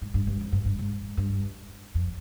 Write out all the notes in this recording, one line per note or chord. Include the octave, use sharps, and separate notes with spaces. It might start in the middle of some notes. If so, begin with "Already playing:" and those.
G#2
G2
G2
F2
G2
G2
G#2
G2
F2